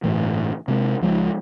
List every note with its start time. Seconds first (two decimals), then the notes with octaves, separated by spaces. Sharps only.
0.03 G1 A2 E3
0.68 C3 G#3
1.01 C#2 F3 G#3